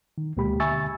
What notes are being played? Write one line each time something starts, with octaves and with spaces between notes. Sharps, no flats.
D#3
D2 B2 G#3 A#3 G4 B5
D3 E5 G#5 C#6 E6 A6